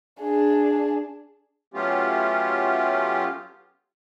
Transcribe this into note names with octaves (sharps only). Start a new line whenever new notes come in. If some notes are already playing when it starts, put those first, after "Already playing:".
D4 G#4
F#3 A3 B3 C#4 F4 G4